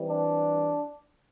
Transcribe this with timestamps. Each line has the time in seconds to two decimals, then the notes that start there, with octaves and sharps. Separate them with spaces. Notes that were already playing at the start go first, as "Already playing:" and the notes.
Already playing: E3 G3 C4
0.09 D4